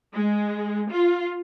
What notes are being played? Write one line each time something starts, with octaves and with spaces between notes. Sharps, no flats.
G#3
F4